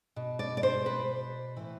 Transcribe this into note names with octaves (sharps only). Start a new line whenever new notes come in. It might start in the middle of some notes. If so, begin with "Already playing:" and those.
B2
D5
D5
C5
B4
A2 E3